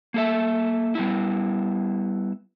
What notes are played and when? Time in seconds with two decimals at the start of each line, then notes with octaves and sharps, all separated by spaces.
0.14 A#3 A4 E5
0.95 G3 B3 E4